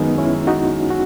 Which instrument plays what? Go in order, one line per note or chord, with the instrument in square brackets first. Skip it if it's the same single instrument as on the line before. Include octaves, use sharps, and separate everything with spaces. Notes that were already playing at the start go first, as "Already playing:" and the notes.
Already playing: [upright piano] F#2 D#3 G#3 [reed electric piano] B3 D#4
[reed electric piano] C#4 E4
D#4 F#4
F#4